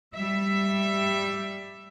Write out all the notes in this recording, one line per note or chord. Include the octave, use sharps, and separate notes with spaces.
G3 E5